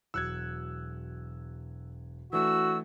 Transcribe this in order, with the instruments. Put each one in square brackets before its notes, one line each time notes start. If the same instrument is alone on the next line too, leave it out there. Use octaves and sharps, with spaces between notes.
[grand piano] E1 F#3 C#7 [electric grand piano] E6 F#6 G#6
[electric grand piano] E3 A3 [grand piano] D4 [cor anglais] F#4 [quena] E6